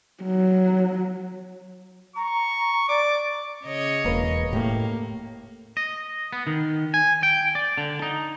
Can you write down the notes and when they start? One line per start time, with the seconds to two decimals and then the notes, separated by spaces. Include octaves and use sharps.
0.24 F#3
2.16 A#5 C#6
2.89 D5 D6
3.65 C#3 C#5 D#5
4.04 E1 A#3 B4
4.53 A2 A#3 G4
5.77 D#5
6.33 B3
6.47 D#3
6.94 G#5
7.23 G5
7.55 D5
7.78 D3
8.02 D#4